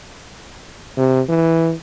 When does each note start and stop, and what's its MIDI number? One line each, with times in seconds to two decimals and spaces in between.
0.97 1.21 48
1.29 1.74 52